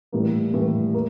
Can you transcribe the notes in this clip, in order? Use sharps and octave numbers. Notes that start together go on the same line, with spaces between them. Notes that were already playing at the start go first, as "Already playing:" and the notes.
A2 E3 G3 A#3
A2 E3 G3 A#3
A#3